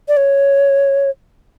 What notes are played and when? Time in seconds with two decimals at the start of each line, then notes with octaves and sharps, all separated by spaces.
0.08 D5
0.17 C#5